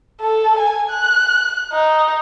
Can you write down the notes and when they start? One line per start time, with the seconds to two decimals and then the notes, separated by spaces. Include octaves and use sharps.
0.21 A4
0.59 G#5
0.90 F#6
1.73 D#4